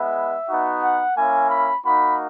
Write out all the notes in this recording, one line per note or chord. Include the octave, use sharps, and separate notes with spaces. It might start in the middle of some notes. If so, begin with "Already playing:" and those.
Already playing: G#3 B3 E4 E5
B3 D#4 F#4
F#5
A#3 C#4 E4 G#5
B5
A#3 D#4 F#4 B5